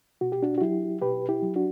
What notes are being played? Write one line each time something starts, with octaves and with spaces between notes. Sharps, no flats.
B2 F#4
G4
D4 F#4
F#4
F#3 E4 G4
B2 G4 B4
E4 G4
F#3
D4 F#4